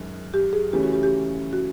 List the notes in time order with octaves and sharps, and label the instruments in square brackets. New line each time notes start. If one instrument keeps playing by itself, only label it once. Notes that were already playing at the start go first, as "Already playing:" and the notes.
Already playing: [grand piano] F#2 D#3 G#3
[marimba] G4
G#4
[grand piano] C#3 E3 A3 C#4 [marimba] G4
[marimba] F#4
G4
G4
F#4